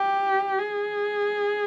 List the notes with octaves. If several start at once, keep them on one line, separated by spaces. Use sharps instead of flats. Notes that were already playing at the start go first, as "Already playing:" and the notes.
Already playing: G4
G#4